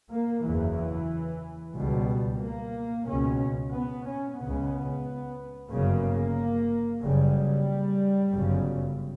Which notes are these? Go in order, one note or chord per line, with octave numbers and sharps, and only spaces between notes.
A#3
F#1 E2 C#3 E3
C#2 B2 G3
A#3
C#2 B2 C#4
B3
C#4
C#2 C#3 B3
G1 F#2 C#3 A#3
F#1 F#2 C#3 G3
G1 F#2 C#3